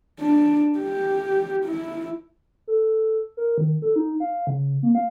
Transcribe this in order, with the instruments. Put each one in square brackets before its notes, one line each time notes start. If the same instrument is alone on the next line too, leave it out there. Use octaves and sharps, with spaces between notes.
[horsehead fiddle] D4
G4
E4
[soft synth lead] A4
A#4
D#3
A4
D#4
F5
C#3
A#3
F5